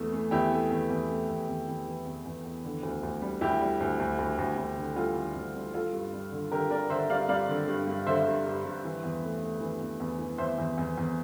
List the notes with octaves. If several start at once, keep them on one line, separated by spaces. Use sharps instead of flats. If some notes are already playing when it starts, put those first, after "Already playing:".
Already playing: E2 E3 A3
A3
E2 E4 G4
A3
E2
E2
A3
E2
E2
E2
E3
E2
E2
E2
D3
D2
D2
G3
D2 E4 G4
G3
D2
D2
D2
D2
D2
D3
G3 F4 A4
D3
D2
G3
G3 F4 A4
G2
G3
D3
D3 G4 A#4
G3 A#4 D5
D3 C5 E5
G2 D5 F5
G3 D5 F5
D3
G2
G2
D3 C5 E5
G2
G2
G2
E3
E2
A3
A3
E3
E2
E2
E3
E2 C5 E5
E2
E2
E2